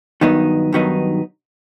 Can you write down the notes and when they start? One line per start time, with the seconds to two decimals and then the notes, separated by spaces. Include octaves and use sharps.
0.21 G2 D#3 F#3 B3 D#4
0.73 G2 D#3 F#3 B3 D#4